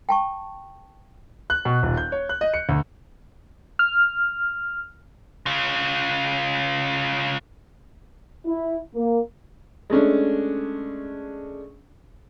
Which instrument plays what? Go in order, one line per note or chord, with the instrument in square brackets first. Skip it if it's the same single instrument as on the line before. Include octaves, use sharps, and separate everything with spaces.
[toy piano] G5 A5 C#6
[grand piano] F#6
B2
D#1
G6
C#5
F#6
D#5
C#7
D2
[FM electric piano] F6
[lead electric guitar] C#3 F4
[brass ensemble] E4
A#3
[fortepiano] G#3 A3 C#4 D4